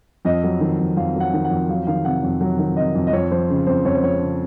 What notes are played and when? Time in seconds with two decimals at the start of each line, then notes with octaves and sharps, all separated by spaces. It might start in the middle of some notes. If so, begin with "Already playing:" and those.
0.25 F2 D#5
0.44 F#3
0.60 D#3
0.79 F2
0.97 F2 F5
1.15 F#3 F#5
1.34 D#3
1.45 F#5
1.50 F2
1.69 F#3 F5
1.87 D#3 F5
2.05 C3 F#5
2.23 F2
2.41 F#3
2.59 D#3
2.77 C3 D#5
2.95 F2
3.07 D#5
3.13 F2 C#5
3.31 F3 C5
3.49 C#3
3.66 F2 C5
3.85 F2 C#5
3.95 C5
4.03 F3 C#5
4.21 C#3